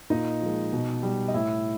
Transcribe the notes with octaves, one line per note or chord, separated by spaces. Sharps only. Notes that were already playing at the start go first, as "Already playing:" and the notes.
A#2 D#4 D#5
F3 G#3
B2
G3
D#5
A2 E4 E5